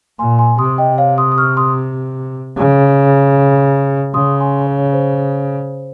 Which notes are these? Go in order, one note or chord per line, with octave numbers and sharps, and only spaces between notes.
A#2 G#5 C6
G#5 C6
C3 C6 D#6
D#5 G5
C#5 F5
C6 D#6
D#6
C#6 F6
C6 D#6
C#3
C#3 C6 D#6
G#5 C6
C#5
C5